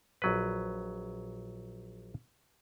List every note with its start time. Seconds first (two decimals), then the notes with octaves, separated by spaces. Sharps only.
0.22 A#1 F#3 B4